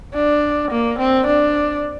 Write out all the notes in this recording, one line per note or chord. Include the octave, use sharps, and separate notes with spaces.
D4
A#3
C4
D4